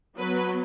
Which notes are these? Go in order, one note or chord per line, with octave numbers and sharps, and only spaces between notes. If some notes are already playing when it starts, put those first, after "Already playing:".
F#3 B3 B4